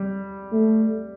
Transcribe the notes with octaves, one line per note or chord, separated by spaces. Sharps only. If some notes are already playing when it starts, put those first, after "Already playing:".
Already playing: G3
A3